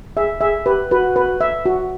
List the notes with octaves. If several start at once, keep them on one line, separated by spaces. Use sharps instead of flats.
G#4 E5
G#4 E5
G4 B4
F#4 B4
B4
E5
F#4